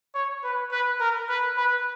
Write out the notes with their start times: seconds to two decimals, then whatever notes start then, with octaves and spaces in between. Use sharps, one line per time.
0.15 C#5
0.43 B4
0.72 B4
1.00 A#4
1.29 B4
1.57 B4